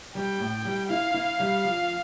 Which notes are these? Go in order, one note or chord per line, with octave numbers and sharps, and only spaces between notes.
G3 G5
A2
G3
E4 F5
E4
G3
F3